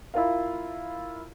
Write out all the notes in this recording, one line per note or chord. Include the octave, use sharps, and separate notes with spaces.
E4 F4 A#4 F5